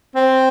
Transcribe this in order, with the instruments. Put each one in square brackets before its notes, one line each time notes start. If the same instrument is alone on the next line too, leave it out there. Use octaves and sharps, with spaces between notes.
[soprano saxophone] C4